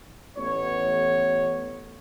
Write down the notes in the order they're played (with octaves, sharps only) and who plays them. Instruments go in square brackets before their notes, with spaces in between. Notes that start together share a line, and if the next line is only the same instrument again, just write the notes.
[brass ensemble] A1 B3 C#5